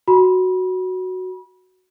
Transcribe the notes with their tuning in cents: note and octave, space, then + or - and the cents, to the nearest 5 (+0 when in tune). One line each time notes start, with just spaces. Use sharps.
F#4 +0 B5 -30